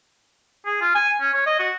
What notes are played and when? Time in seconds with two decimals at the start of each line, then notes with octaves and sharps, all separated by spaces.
0.66 G#4
0.81 F4
0.95 G#5
1.21 C#4
1.33 C#5
1.46 D#5
1.59 F#4